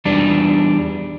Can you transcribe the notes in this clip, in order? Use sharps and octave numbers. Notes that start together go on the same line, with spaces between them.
E2 G3 D4